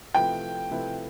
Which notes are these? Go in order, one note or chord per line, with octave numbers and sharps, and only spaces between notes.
C3 F3 A3 E4 B4 G5
C3 F3 A3 E4 B4